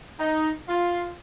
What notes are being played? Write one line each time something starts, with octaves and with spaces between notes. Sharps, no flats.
D#4
F4